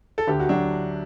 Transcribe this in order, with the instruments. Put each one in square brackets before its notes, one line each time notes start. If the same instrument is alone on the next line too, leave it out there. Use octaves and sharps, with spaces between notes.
[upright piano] A4
[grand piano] D2 [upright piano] G4
[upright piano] F#4
[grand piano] F#3 [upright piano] D4